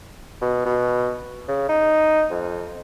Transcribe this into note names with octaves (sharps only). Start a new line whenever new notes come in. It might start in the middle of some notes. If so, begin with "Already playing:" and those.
B2
B2
C#3
D#4
F2